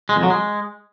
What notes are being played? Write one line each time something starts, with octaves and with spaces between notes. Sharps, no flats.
G#3
F2
F#3
G#3